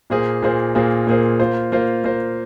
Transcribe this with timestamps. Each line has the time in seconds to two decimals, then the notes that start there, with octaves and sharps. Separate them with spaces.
0.10 A#2 A#3 G#4 C5
0.42 A#2 A#3 G#4 C5
0.75 A#2 A#3 G#4 C5
1.07 A#2 A#3 G#4 C5
1.40 A#3 F4 C5
1.72 A#3 F4 C5
2.04 A#3 F4 C5